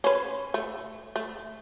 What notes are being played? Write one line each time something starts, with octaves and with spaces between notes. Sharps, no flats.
C#4 B4
A3
A3